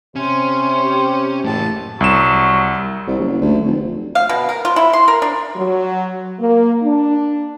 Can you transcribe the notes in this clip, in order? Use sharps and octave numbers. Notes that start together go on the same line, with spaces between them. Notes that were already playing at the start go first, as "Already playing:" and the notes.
C3 C#4 C5
G4
F#1 A2 E3 A5
C2 F#3 E7
C2
F#1
D2
F1
F5
B2
A#4
F4
E4
C6
A#4
D4
F#3
A#3
D4